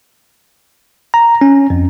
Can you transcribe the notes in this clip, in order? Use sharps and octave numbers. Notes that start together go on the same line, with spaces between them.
A#5
C#4
F2